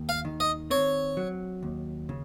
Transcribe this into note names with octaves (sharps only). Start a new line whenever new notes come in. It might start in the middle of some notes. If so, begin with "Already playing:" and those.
Already playing: D#2
F5
D#3
D#5
C4 C#5
F#3
D#2
C#3